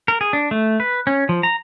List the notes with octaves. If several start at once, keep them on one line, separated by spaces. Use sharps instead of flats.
A#4
G#4
D4
A3
B4
C#4
F3
A#5